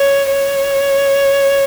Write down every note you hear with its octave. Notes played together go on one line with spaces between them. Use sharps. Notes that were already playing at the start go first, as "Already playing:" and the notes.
Already playing: C#5
C#5